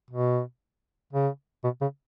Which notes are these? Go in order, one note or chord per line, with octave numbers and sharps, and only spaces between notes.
B2
C#3
B2
C#3